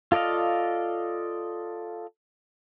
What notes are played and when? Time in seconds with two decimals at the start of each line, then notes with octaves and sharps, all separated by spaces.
0.12 F4 A4 D5 D#5 F5